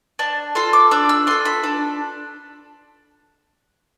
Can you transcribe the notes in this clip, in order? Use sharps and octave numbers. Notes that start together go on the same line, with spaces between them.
D4 A5
F4 A4 C6
D6
D4 E6
E6
F4 A4 C6
B5
D4 A5